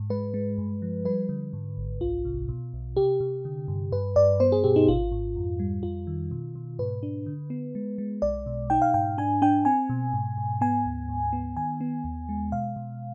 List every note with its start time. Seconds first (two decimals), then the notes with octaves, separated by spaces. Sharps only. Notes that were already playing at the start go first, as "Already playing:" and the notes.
Already playing: G#2
0.10 G#3 B4
0.34 G#3
0.58 G2
0.82 F3
1.05 G3 B4
1.29 D3
1.53 G#2
1.77 G#1
2.01 C2 F4
2.25 C3
2.49 B2
2.73 B1
2.97 C3 G4
3.20 C3
3.45 D3
3.68 G2
3.92 G2 B4
4.16 G2 D5
4.40 B3 C5
4.52 G#4
4.64 B2 G4
4.76 D#4
4.88 G#1 F4
5.12 G#2
5.36 F2
5.59 G3
5.83 F2 F4
6.07 D#3
6.31 B2
6.55 B2
6.79 G#2 B4
7.03 D4
7.26 D3
7.50 B3
7.75 G#3
7.98 G#3
8.22 B1 D5
8.46 B2
8.70 D#4 G5
8.82 F5
8.94 G#2 G5
9.18 D4 G#5
9.42 D4 G5
9.65 C4 G#5
9.89 B2
10.13 G#2
10.37 G#2
10.61 B3 G#5
10.86 D2
11.09 G#2
11.33 B3
11.57 D#3 G#5
11.81 B3
12.04 D#2
12.29 G#3
12.52 B2 F5
12.76 B2